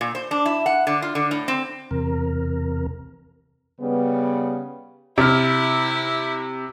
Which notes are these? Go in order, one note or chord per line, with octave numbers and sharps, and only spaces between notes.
A#2
C5
D4
E4
F#5
D3
F4
D3
A2
C4
E2 C3 A#4
C#3 G3 B3
C3 E4 F6